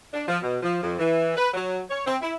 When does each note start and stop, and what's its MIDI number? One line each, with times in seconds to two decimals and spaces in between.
0.14 0.24 62
0.28 0.38 53
0.42 0.58 47
0.63 0.79 53
0.82 0.96 41
0.99 1.35 52
1.36 1.49 71
1.54 1.81 54
1.90 2.05 73
2.06 2.16 60
2.21 2.33 64